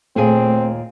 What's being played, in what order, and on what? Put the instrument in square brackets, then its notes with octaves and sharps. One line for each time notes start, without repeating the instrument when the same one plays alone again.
[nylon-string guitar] D#2 A#2 G#4 [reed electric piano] A3 [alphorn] C4